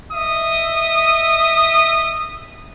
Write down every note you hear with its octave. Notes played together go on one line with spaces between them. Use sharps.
D#5 E5 D#6